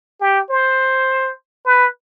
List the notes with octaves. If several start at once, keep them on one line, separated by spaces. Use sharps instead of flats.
G4
C5
B4